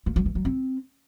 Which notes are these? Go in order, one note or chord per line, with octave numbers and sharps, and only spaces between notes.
A#3
F#3
E3
F#3
C4